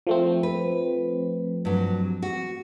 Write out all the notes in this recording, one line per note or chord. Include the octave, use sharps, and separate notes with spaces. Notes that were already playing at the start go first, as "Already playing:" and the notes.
F3 A3 C4
B4
G2 F#3
F#4